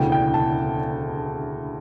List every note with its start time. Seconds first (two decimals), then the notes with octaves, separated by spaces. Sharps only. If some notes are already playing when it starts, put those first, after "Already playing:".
Already playing: E1 D2 C#3 E3 G5
0.12 G5
0.34 A5